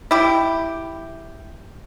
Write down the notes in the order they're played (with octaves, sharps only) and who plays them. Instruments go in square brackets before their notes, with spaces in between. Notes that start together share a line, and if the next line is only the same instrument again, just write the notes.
[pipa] E4 G4